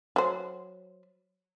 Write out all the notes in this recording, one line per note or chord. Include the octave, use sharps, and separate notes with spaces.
F#3 C5